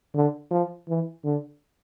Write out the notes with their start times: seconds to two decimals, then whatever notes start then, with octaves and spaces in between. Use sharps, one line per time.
0.15 D3
0.51 F3
0.88 E3
1.24 D3